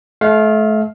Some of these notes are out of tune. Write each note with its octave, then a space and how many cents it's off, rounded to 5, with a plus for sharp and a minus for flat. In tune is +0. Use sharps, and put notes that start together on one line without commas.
A3 -35 F5 +0